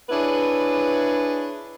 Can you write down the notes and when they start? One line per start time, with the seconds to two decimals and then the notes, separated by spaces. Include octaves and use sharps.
0.10 D4 E4 G#4 B4 C#5